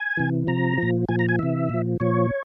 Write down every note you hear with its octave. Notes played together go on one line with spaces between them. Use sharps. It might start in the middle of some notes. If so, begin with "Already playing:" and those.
Already playing: G#5
C3 E3
C3 F3 A#5
A#2 F3
A#2 F3 G#5
A#5
G#5
C3 E3 E5
A#2 F3
A#2 F3 C#5